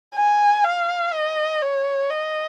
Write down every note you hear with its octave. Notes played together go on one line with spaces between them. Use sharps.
G#5
F5
D#5
C#5
D#5